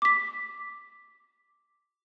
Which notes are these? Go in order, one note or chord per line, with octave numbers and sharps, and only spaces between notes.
D6 B6